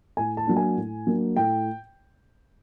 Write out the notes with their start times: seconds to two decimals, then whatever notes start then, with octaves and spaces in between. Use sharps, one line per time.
0.17 A2 G#5
0.37 A5
0.47 F#3 A#3 D4
0.57 G#5
0.77 A2
1.07 F#3 A#3 D4
1.36 A2 G5